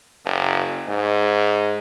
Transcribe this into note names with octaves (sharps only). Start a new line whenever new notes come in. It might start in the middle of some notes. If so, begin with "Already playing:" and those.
F#1
G#2